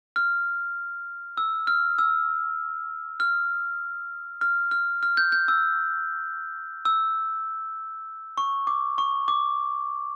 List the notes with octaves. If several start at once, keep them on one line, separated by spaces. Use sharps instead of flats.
F6
E6
F6
E6
F6
F6
F6
F6
G6
G6
E6
E6
C#6
D6
C#6
D6